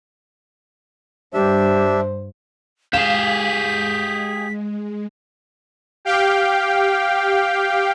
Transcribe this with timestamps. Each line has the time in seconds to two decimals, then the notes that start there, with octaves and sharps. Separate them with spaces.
1.34 G2 D4 G4 C5 E5
2.93 G#3 G4 G#4 F5 B6 E7
6.05 G4 F5 G5